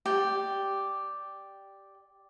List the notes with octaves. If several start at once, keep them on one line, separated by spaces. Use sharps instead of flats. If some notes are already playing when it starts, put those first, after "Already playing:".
G4 D5 G5